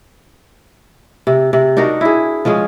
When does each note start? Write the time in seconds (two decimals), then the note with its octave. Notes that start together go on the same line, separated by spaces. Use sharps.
1.27 C3
1.53 C3
1.77 D4 D#4 F#4 A#4
2.01 E4 G#4
2.45 F3 G#3 C#4 G#4